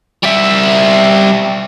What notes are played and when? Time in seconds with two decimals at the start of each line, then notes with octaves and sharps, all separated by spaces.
0.23 G3 E5